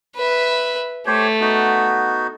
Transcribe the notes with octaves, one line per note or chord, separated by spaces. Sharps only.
B4 E5
A3 G4 C5 C#5
B3 D#4 F#4